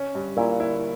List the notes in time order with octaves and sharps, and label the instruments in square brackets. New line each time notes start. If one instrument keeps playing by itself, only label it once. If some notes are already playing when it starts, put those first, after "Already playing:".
Already playing: [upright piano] C#4
G2
[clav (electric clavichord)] A#2 [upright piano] E4
[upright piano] E4